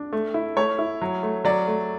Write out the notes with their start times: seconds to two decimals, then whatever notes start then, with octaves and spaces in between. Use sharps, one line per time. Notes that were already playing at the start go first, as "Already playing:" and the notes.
Already playing: D4
0.13 A3
0.34 E4
0.57 A3 C#5
0.79 E4
1.02 F#3
1.23 A3
1.45 F#3 D5
1.68 A3